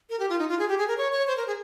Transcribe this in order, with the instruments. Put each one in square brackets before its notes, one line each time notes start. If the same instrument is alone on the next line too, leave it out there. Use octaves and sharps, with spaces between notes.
[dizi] A#4
G4
F4
D#4
F4
G#4
G4
G#4
A#4
C#5
C#5
C5
A#4
G#4